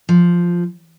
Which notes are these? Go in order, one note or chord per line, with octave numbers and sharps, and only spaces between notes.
F3